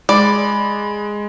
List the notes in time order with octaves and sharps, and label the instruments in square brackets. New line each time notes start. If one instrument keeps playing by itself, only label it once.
[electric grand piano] G#3 [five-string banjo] D5 [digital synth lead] B5